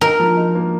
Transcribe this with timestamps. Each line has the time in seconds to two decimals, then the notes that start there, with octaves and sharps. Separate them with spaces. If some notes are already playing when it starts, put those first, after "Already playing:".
0.01 D#4 A#4
0.20 F3
0.37 D#4
0.55 A#3